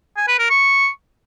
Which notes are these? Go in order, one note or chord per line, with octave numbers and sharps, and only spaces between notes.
G#5
B4
A#4
C#6